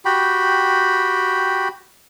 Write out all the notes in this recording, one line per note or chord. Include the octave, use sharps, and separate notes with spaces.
F#4 G4 G5 B5